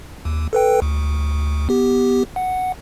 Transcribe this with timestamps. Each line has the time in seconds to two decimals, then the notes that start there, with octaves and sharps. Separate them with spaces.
0.25 D#2
0.53 A4 B4 G5
0.82 D2
1.69 B3 G4
2.36 F#5